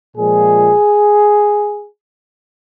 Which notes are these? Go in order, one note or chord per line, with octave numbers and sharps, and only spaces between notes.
A#2 F3 G#3 G#4